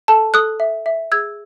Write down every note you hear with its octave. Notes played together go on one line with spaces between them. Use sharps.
A4 A5
A4 D#6 F#6
E5
E5
G#4 E6 G#6